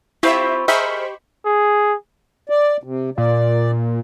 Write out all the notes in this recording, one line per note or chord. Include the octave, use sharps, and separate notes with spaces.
C4 E4 F4 G4 E5 B5 C#6
G4 G#4 A#4 C5 D#5 E5 B5 C#6
G#4
D5
C3
A#2 D5